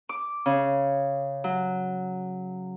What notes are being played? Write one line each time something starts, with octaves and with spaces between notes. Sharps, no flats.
D6
C#3
F#3